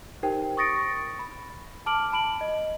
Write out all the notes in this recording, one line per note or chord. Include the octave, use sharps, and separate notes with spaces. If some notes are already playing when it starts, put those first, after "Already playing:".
D#4 G4 A#4 C5 G5
C#6 D#6 A6 A#6 C#7 D7
B5
A5 D6 F6 D7 F#7
A5 B5 D7 F#7
D#5